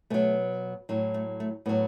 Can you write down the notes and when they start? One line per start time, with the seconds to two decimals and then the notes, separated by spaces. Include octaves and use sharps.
0.10 B2 F#3 A3
0.89 A2 F#3
1.14 A3
1.40 A3
1.66 A2 F#3 B3